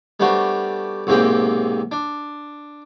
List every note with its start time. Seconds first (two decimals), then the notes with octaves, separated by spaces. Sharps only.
0.20 G3 A3 B3 D4 F#4 C5
1.07 B1 G#2 C3 A#3 G#4 G5
1.92 D4